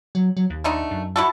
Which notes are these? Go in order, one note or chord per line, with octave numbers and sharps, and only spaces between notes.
F#3
F#3
D#2
D3 A3 D#4
F#2
E4 F#4 A4